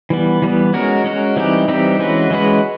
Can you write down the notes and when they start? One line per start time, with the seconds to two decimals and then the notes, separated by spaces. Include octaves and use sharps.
0.10 E3 G3 B3
0.42 E3 G3 B3
0.74 G#3 C#4 F#4 A#4
1.04 G#3 C#4 F#4 A#4
1.36 E3 G3 C4 D#4 G4
1.68 E3 G3 C4 D#4 G4
1.99 E3 G#3 C#4 F#4 B4
2.30 E3 G#3 C#4 F#4 B4